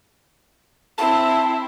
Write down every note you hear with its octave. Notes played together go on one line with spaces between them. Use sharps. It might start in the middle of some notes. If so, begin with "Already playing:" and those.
C4 E4 A5